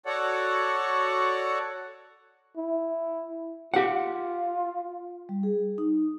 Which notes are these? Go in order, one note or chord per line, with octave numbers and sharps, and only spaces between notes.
F#4 A4 C#5 D5 F#5
E4
F4 G4 F5 F#5
G3
G#4
D#4